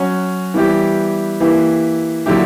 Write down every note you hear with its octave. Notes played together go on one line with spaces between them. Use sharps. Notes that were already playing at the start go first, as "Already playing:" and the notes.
Already playing: F#3 C#4 F#4
E3 G3 B3 E4 G4
E3 A#3 E4 G4
D3 F#3 A#3 E4 G4